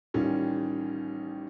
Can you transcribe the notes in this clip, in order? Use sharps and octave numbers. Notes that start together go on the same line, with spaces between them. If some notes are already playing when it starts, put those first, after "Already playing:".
A1 D#3 G3 C#4 F4